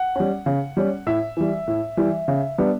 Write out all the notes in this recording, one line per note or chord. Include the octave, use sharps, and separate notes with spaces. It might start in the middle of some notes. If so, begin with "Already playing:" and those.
Already playing: F#5
G3 C#4
C#3
G3 C#4
A2 E5
E3 G3
A2
E3 G3
C#3
G3 B3 D4